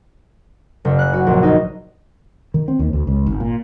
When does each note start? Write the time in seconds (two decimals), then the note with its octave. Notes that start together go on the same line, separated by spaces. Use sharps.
0.85 F#1
0.99 F#6
1.13 F#4
1.27 A#1
1.43 D#4
2.54 D#3
2.68 C4
2.79 D#2
2.93 D2
3.07 C#2
3.26 G#1
3.40 A#2